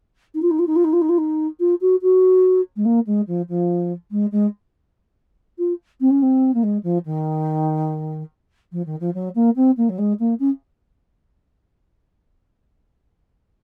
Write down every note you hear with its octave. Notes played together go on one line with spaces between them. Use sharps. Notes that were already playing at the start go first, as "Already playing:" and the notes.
D#4
F4
D#4
F4
D#4
F4
D#4
F4
D#4
F4
D#4
F4
F#4
F#4
G#3
A#3
G#3
F3
F3
G#3
G#3
F4
C4
C#4
C4
A#3
G#3
F3
D#3
F3
D#3
F3
F#3
A#3
C4
A#3
F#3
G#3
A#3
C#4